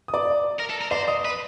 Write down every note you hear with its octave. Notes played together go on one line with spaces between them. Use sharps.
D#6
D5 D6
A#4
A4
A#4
C5 D5 D6
D#5 D#6
B4